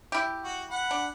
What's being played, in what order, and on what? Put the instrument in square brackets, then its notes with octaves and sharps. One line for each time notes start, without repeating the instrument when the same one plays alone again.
[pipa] E4 G4
[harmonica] F#4
F#5 B5
[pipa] D4